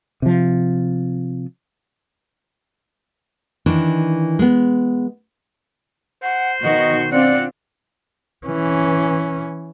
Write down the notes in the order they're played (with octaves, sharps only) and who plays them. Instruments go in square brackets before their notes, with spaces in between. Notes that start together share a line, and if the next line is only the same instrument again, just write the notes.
[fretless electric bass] C3 F3
[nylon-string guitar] D#3 E3 D4
G#3 B3
[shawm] C5 [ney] F#5
[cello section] B2 D#3 F#4 [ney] D#5
[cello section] C4 D4 F4 [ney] D5 [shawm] F#5
[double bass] E3 C#4